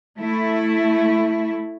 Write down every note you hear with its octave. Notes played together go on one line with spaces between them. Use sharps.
A3 E4